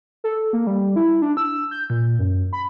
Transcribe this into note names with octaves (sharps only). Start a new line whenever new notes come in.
A4
A#3
G3
E4
D4
E6
G6
A#2
F#2
B5